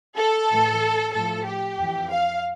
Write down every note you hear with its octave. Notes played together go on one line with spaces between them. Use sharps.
A4
A2 E3
A2 F3 A4
G4
F2 E3
F5